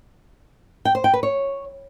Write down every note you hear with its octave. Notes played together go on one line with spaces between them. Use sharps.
G5
C5
G5
B4
C#5